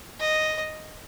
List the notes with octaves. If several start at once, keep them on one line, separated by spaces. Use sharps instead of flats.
D#5